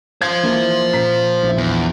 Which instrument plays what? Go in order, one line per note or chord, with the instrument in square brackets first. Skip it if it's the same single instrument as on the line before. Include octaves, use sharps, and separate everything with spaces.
[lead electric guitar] C5 F5 [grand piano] G#6
[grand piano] E3 A#3 E4
A#2 A#5 B6
A#1 E4
[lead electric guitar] E2